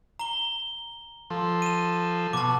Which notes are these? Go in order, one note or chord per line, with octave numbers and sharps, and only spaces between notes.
A#5 G7
F3 A4 C6
D#7 E7
B2 A5 D6